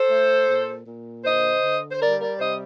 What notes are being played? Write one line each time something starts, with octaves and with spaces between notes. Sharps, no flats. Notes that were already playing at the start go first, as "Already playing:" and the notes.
Already playing: A4 C5
A3
A#2
A#2
D3 C5 D#5
D3
C5
G3 A#4 D5
A#4 D5
C3 C5 D#5